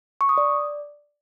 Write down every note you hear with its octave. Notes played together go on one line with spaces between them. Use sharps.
C#6
D#6
D5